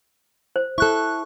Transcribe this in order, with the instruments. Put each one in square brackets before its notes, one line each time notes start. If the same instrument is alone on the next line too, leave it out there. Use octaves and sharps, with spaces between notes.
[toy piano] C5
[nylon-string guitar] E4 A4 [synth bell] C#6 F#6